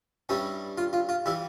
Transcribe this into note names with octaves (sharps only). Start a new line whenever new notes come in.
G2 G3 C#4 E4
F4
F4
F4
E3 G3 E4